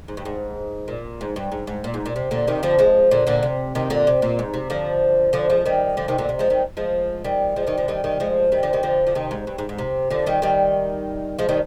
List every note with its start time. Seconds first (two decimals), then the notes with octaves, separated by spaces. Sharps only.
0.08 G#2
0.17 G2
0.25 G#2
0.88 A#2
1.21 G#2
1.36 G2
1.52 G#2
1.67 G#2
1.84 A#2
1.94 G#2
2.06 A#2
2.16 C3
2.31 A#2 D3
2.47 C3 D#3
2.63 D3 F3
2.79 F3 G#3
3.11 A#2 D3
3.27 A#2 D3
3.43 C3
3.75 C3 D#3
3.90 A#2 D3
4.07 C3
4.22 A#2
4.39 G#2
4.54 C3
4.70 D3 F3
5.33 D3 F3
5.50 F3 G#3
5.66 D#3 G3
5.97 D3 F3
6.08 C3 D#3
6.18 A#2 D3
6.29 C3
6.39 F3 G#3
6.50 D#3 G3
6.77 F3 G#3
7.24 D#3 G3
7.56 F3 G#3
7.67 D#3 G3
7.78 D3 F3
7.88 D#3 G3
8.04 D#3 G3
8.20 F3 G#3
8.52 D#3 G3
8.63 D3 F3
8.73 D#3 G3
8.83 D3 F3
9.07 F3
9.15 C3 D#3
9.31 G#2
9.47 G2
9.58 G#2
9.69 G#2
9.78 C3
10.10 D3 F3
10.26 D#3 G3
10.42 D#3 G3
11.39 F3 G#3
11.49 D#3 G3